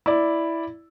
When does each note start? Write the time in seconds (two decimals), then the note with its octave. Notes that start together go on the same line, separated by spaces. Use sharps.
0.06 E4 D5